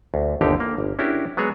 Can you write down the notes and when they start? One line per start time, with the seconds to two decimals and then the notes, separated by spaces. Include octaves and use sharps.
0.14 D2
0.41 G1 D#2 D3 D#4 G4 F5
0.60 A#3
0.78 G1
0.99 C#4 D4 E4 F#4 G4 A#4
1.37 F#3 G#3 B3 F#4 G#4 C#5